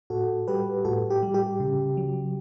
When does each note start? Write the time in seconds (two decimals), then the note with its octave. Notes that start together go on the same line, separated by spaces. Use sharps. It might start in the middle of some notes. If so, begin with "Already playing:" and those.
0.10 A2 F#4 A4
0.48 G3 G4 B4
0.85 A2 F#4 A4
1.10 G4
1.23 G3
1.34 G4
1.60 C#3
1.97 F#3